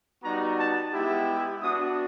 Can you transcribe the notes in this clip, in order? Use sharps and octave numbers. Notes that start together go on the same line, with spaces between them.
G3 B3 D#4 F#4 A#5
A5
G#3 B3 E4 G4
B3 D4 F#4 D#6